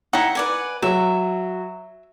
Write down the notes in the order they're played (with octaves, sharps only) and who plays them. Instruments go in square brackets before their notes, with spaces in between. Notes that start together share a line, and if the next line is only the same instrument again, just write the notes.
[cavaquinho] D#4 E4 [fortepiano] F#5
[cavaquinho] B4 D5 G#5
[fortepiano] F#3 [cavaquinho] E5